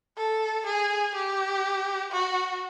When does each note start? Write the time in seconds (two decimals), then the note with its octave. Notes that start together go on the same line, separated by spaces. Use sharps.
0.17 A4
0.66 G#4
1.15 G4
2.11 F#4